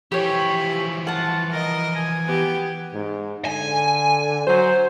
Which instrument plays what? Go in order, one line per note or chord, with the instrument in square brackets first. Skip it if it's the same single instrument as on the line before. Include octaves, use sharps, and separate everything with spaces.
[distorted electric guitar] E3 F3 [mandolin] G4 C#5 [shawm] B5
[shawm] F4 [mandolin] F#5 A5
[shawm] A#4 [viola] D#5
[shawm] G#5
[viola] B3 G4
[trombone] G#2
[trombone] D3 [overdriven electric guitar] G#5
[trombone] F#3 [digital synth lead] C5